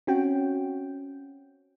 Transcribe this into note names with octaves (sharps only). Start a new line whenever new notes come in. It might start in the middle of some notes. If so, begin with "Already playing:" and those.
C4 C#4 F#4 G5